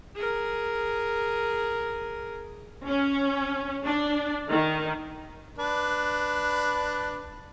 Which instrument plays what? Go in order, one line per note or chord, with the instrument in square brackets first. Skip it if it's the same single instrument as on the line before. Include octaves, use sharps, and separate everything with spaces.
[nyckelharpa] G#4 A#4
[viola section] C#4
D4
D#3
[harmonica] D4 B4